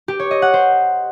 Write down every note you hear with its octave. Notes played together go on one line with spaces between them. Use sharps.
G4
C#5
D#5
F#5
C5